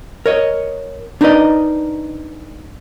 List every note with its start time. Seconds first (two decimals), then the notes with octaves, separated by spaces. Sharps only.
0.26 A#4 C#5 D#5
1.21 D4 D#4 A#4 B4 D5 D#5